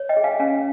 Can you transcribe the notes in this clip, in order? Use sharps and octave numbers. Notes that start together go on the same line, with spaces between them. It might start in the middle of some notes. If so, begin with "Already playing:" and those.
Already playing: C#5
D#5 G5
G#4
F5 G#5
C#4 F5 G#5